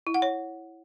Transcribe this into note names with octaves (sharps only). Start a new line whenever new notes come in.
E4
F#5
C#5